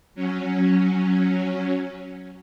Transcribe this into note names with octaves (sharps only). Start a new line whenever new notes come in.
F#3 C#4